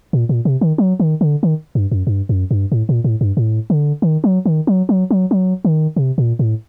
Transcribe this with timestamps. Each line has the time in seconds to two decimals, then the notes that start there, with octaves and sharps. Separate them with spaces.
0.13 A#2
0.29 A#2
0.45 C3
0.61 D#3
0.78 F#3
1.00 D#3
1.21 D3
1.43 D#3
1.75 G2
1.92 F#2
2.07 G2
2.29 F#2
2.51 G2
2.72 A2
2.89 A#2
3.04 A2
3.21 G2
3.37 A2
3.70 D3
4.02 D#3
4.24 F#3
4.46 D#3
4.67 F#3
4.89 F#3
5.11 F#3
5.31 F#3
5.65 D#3
5.96 C3
6.18 A#2
6.39 A2